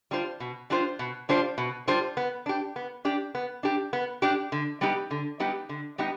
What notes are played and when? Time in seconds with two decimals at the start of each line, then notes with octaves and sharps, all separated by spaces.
0.11 G3 D4 F4 C5
0.40 B2
0.70 G3 D4 F4 C5
0.99 B2
1.29 G3 D4 F4 C5
1.58 B2
1.88 G3 D4 F4 C5
2.17 B3
2.46 D4 G4
2.76 B3
3.05 D4 G4
3.35 B3
3.63 D4 G4
3.93 B3
4.22 D4 G4
4.52 D3
4.81 G3 B3 D#4 G4
5.11 D3
5.40 G3 B3 D#4 G4
5.69 D3
5.98 G3 B3 D#4 G4